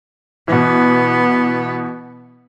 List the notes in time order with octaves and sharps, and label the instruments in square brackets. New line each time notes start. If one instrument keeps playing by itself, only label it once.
[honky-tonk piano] B2 E3 [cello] B3